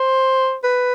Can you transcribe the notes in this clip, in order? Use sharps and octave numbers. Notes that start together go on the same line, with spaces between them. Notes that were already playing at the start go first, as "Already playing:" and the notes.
Already playing: C5
B4